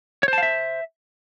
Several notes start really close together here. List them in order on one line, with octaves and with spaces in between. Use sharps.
C#5 C5 A5 F5 E5